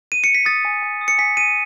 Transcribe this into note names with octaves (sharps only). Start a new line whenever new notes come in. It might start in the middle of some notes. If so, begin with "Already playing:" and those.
D#7
C#7
B6
D#6 A6
G#5
G#5
D#6
C#7
G#5 B6
G#5 D#7